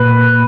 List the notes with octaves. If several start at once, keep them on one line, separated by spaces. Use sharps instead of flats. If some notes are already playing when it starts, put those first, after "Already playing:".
Already playing: A#2 B4